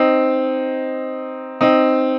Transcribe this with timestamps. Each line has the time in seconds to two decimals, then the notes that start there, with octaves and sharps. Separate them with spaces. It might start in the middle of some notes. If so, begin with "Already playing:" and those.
Already playing: C4 D#4
1.61 C4 D#4